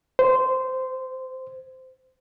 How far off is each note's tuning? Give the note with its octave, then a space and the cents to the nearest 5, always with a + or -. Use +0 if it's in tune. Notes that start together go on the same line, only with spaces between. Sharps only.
C5 -15